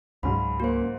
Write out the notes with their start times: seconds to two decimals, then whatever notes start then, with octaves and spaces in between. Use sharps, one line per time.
0.23 C#2 G#2 C#3 F#3 C#4 B5
0.60 A#3 F#4 C5